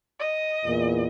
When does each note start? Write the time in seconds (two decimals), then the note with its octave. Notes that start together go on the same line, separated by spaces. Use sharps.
0.19 D#5
0.65 E2 A#2